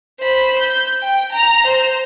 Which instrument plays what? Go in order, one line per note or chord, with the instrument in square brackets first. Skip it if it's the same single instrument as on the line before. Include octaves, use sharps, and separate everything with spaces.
[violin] C5 B5
G6
G5
A#5 F7
C5